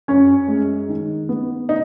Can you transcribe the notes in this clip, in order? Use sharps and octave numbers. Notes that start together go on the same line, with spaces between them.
F#2 C#4 C#5
G#3
D#3
B3
D#4